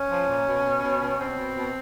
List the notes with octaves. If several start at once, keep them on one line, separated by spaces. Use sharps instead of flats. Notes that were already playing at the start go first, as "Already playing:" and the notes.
Already playing: C#4
F3
A#2
B2
B2
B2
B2
B2 C4
B2
B2